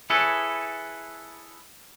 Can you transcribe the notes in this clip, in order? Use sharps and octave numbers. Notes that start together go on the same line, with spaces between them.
E4 G#4 A4 B4 C#5